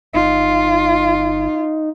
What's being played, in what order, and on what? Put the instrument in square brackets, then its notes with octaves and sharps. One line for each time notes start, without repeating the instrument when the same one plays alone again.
[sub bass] G1 [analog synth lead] D#4 [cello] F4